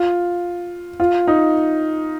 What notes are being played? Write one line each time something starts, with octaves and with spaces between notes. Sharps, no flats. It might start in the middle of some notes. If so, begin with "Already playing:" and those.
Already playing: F4
F4
D#4